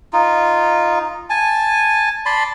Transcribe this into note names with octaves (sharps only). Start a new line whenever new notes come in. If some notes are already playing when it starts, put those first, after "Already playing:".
D#4 F4
G#5 A5
D5 A5 B5 C6